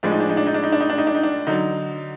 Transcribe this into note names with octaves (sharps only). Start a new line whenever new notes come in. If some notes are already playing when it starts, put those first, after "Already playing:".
A2 F3 G#3 D4
D#4
D4
D#4
D4
D#4
D4
D#4
D4
D#4
D4
D#4
D4
D#4
D4
D3 F#3 D#4